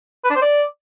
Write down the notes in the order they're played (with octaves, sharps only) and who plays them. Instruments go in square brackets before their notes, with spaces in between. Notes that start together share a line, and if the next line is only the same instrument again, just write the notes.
[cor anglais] B4
D4
C5
D5